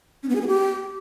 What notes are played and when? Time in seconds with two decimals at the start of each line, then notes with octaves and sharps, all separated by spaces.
0.23 C#4
0.29 B3
0.35 G#4
0.41 B3
0.47 G4